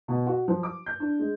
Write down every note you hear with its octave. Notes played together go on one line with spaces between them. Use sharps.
B2
F#4
F3
D6
G6
D4
G#3